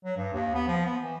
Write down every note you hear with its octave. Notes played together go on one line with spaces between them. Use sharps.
F#3
G2
D#2
B3
F3
B3
E3